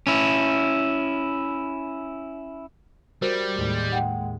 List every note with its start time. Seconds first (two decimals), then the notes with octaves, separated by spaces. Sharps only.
0.07 C#4 E4
3.22 G3 F#4 A#4 C5
3.55 D#2 A2 G#3
3.92 F#5 G5